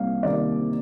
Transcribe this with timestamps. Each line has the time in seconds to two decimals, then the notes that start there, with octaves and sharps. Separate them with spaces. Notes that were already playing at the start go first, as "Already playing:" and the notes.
Already playing: C2 C3 A#3 F5
0.23 C3 D#3 A#3 D5